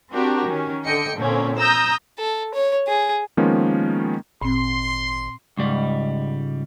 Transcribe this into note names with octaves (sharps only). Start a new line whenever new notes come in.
C4 D4 F#4 G4 A#4
D#3 C#4
D3 D#5 G5 C#7
A#2 D3 A#3 C4 C#4
A#5 D#6 E6 G6 A#6
A4
C#5
G#4
D#3 F3 G#3 A#3 B3 C#4
G#1 A#2 C4 C6
C#2 G#2 G3